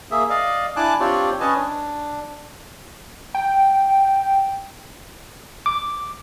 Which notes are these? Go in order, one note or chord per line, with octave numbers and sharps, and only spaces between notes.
A#3 G#4 E5
D5 D#5 F5
D4 E4 G#5 A5 D6 F#6
C4 D4 F4 G4 C#5 D5
C#4 B4 C#5 D#5 G#5 A5
D4
G5
D6